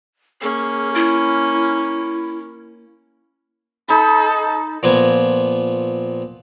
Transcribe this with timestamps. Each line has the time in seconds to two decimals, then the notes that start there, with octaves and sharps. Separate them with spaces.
0.41 A#3 C#4 G#4
0.95 E4
3.88 D#4 A4 B5
4.83 A#2 F3 B3 G#5